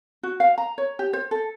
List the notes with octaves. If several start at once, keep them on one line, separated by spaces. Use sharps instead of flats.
F#4
F5
A#5
C#5
G4
C5
A4